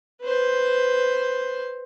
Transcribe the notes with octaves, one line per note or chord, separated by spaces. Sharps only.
B4 C5